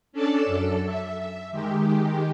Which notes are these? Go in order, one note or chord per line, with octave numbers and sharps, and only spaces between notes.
C#4 D4 A4 D5 A5
F#2 A4
E5
D#3 G#3 G4